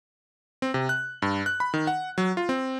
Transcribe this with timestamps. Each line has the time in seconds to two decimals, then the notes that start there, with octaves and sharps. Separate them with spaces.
0.62 C4
0.74 C3
0.89 F#6
1.22 G2
1.46 F#6
1.60 B5
1.74 D#3
1.87 F#5
2.18 F#3
2.37 F4
2.49 C4